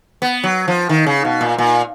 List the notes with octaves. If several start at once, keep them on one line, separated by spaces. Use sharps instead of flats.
B3
F#3
F3
D#3
C#3
B2
A#2
A#2